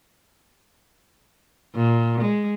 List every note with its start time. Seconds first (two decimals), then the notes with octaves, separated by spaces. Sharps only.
1.75 A#2
2.21 G#3